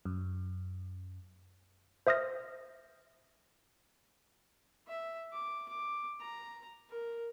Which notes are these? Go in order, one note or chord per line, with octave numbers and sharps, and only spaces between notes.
F#2
C5 E5 D#6 F6 A#6
E5
D6
D6
A#5
A#4